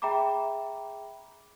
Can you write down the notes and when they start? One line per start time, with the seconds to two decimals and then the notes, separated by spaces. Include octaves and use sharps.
0.02 G#4 E5 G5 A#5 B5 D6